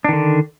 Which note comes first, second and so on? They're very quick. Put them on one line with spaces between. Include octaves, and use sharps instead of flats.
D4 D#3 D3